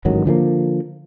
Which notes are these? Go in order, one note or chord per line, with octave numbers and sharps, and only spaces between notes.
A1 G#2 D#3 F#3
D3 F3 G3 A#3